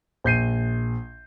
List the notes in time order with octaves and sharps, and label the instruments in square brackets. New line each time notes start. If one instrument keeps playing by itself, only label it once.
[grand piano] A#1 G6 C7 D#7